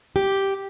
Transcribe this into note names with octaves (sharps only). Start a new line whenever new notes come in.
G4